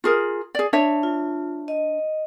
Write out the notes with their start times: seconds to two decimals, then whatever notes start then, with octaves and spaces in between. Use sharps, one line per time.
0.04 F4 G#4 A#4
0.55 G#4 D5
0.73 D4 C#5 E5
1.03 F4
1.68 D#5